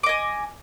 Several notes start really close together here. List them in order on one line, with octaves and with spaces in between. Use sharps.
D6 D#5 G#5